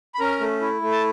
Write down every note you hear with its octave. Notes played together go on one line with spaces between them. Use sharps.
B5
C#4 A#4 A#5
A3
E4
A3
A5